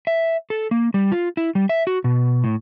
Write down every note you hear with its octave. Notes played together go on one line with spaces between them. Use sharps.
E5
A4
A#3
G3
F4
E4
G3
E5
F#4
B2
A2